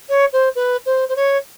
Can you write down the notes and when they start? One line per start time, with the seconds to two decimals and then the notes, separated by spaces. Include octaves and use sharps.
0.09 C#5
0.33 C5
0.55 B4
0.86 C5
1.09 C5
1.16 C#5